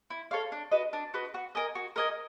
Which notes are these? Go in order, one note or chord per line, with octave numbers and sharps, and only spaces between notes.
E4
A4 C#5 F5
D4
F#4 B4 D#5
D4
F#4 B4 D#5
F#4
A#4 D#5 G#5
F#4
A#4 D#5 G#5